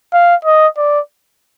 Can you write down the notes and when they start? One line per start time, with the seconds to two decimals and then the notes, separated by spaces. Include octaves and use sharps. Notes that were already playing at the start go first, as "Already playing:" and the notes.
0.13 F5
0.45 D#5
0.77 D5